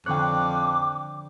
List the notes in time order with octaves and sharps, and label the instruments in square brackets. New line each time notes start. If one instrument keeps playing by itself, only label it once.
[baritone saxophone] F2 [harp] D3 C#5 [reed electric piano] G5 F#6 [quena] D6